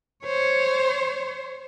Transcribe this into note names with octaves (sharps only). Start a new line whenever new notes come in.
C5 C#5